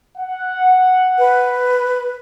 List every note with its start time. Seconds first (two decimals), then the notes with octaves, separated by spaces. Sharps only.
0.18 F#5
1.19 B4